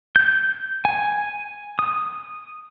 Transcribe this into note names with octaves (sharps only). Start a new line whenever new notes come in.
G6
G#5
D#6